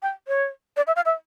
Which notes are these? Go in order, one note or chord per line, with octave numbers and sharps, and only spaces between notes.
G5
C#5
D5
E5
F5
E5